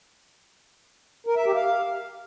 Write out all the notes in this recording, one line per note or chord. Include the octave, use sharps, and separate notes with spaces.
A#4
E5
G4
F5